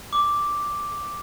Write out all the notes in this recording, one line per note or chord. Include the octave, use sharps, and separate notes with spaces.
D6